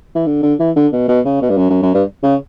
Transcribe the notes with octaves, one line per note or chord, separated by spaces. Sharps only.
E3
D3
D3
E3
D3
B2
B2
C#3
B2
G2
F#2
F#2
F#2
G2
C#3